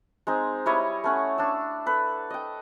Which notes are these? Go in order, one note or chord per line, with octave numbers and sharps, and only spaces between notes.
G#3 C4 D#4
G3 E4 C#5 D#5
A3 C#4 F#5
D4 E6
A4 B4
D#5 G5